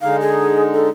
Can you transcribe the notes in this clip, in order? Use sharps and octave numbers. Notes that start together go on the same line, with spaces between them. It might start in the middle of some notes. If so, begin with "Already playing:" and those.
D3 G#3 D#4 F5
G#4
A4